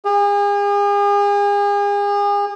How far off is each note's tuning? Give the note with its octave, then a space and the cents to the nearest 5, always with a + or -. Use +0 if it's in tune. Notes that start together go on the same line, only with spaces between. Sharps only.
G#4 -40